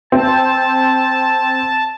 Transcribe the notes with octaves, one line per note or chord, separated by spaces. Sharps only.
C4 A5